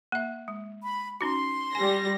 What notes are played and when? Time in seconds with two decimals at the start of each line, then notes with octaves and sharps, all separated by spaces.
0.12 A#3 E5
0.48 G#3
0.83 B5
1.21 C#4 D#4 F#4 C6
1.75 G3 G#5 A#6